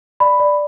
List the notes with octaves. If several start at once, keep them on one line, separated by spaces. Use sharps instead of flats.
D5 B5
D5